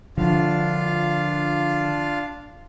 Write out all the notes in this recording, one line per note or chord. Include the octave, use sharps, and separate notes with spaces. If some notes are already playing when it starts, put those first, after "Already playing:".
D3 F3 D4 F4 F5